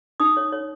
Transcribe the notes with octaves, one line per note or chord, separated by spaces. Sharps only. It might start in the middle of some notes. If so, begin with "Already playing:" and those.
D#4 D#6
C#5
C#5